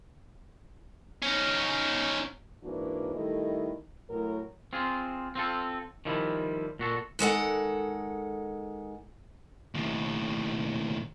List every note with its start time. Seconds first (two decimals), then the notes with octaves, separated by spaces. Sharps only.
1.22 C#4 D#4
2.64 G#2 E3 A#3 D4 F#4
3.16 D#3 G3 A3 E4 A4 D#5
4.10 A2 F#3 A#4
4.73 C4 F4 G#4
5.35 C4 F4 A4
6.05 D#3 F3 G3 E4
6.79 A#2 F#4 A4
7.19 D#3 G#3 A4 F#5
9.75 D#2 A2